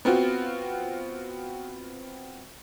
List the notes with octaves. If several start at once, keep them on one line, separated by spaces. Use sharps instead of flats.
B3 C4 F4 F#4